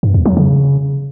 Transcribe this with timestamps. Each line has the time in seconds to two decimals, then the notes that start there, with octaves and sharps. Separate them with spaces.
0.03 G2
0.14 E2
0.26 F#3
0.37 C#3